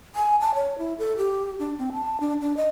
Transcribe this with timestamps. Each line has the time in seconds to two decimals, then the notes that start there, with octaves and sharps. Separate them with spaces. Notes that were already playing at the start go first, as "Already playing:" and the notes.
0.15 G#5
0.41 A5
0.55 C#5
0.78 E4
0.99 A4
1.17 G4
1.59 D4
1.79 C4
1.93 A5
2.20 D4
2.41 D4
2.57 D#5